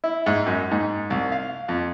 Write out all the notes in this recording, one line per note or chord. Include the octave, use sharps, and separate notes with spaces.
E4
G#2
F#2
G#2
C2
F5
F2